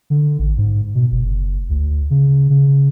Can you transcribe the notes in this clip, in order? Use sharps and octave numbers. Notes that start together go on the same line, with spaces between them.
D3
A1
G#2
B2
F#1
D2
C#3
C#3